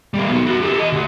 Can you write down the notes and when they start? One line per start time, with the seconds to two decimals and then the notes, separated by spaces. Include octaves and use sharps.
0.14 G3 A#3
0.28 F#3 B3
0.47 F#4 A#4
0.61 G4 A4
0.76 G4 D#5
0.93 D2